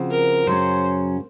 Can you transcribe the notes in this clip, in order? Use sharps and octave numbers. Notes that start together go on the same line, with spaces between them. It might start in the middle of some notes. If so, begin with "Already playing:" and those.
Already playing: C#3 F3 C4 F#4
A#4
F#2 C#3 F#3 C#4 C5